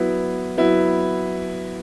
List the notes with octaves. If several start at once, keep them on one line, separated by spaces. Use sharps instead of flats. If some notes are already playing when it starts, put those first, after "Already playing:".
Already playing: F#3 B3 E4
F#3 B3 E4